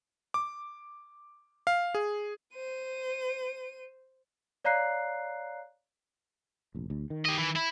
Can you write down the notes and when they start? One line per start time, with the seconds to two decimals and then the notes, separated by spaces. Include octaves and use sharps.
0.34 D6
1.67 F5
1.95 G#4
2.54 C5 D#7
4.65 C#5 D5 F5 A#5 F#6 C7
6.75 F1 A#1
6.90 D2
7.10 D#3
7.25 G4 D#5
7.38 E3
7.56 E4